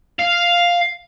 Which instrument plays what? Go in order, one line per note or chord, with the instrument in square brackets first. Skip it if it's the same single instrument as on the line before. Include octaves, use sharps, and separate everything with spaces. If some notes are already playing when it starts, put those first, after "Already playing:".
[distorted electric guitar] F5